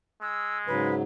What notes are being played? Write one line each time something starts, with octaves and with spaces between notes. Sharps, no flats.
G#3 E6
G#2 C#3 F#3 B4